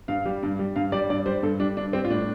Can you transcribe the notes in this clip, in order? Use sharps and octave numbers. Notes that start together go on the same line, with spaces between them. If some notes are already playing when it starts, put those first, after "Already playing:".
G2 F5
G3
G2
G3
G2 F5
G3 D5
G2 D5
G3 C5
G2 A4
G3 D4
G2 D4
G3 C4
F4
A2 D4